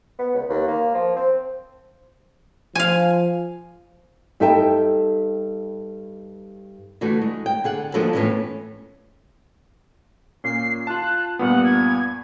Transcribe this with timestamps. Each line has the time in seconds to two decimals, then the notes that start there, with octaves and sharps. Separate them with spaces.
0.19 B3
0.35 C#2
0.49 D#2
0.68 A#3
0.95 F3
1.17 C4
2.75 F3 F5 G#5
4.40 G2 D#4 A4 E5 G5 A5
7.01 D3 E3 A3 F#4
7.21 G#3
7.46 G5
7.64 D3 G#4 F#5
7.94 F3 G#3 A#3 D4 F#4 A4
8.13 F2 A2 C#3 E3 B3 C#4
10.44 A#2 C#4 C7
10.87 F4 A5 F#6
11.39 G2 A#2 B3 F#5
11.63 G#6